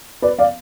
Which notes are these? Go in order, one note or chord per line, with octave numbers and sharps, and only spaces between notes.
B4 D5
D5 F5